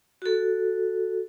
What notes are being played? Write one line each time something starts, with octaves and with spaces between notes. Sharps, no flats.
F#4 A4